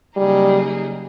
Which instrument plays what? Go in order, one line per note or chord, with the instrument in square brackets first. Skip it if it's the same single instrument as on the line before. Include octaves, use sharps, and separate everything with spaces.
[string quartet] C#3 F#3 A#3 D#4 G#4 [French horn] G3